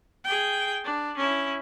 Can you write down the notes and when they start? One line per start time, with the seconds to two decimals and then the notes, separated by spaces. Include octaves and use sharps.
0.24 G#4 G5
0.84 D4
1.17 C#4 E4